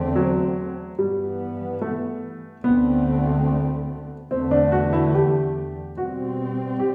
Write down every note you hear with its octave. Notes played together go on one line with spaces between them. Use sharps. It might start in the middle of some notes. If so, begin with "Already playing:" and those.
Already playing: E2 D3 A3 C4
F#3
G2 E3 G3 B3
A3
D2 D3 A3 B3 C4
E2 D3 A3 C4
D4
F#4
E4
G4
B2 G3 C4 F#4
G4